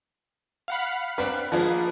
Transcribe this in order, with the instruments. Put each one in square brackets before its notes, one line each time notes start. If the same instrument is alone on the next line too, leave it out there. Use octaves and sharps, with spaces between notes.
[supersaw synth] F5 F#5 B5
[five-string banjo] C4 D4 B4 [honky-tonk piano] F#6
[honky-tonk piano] F3 B4 [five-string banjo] G#3 A#3 G#4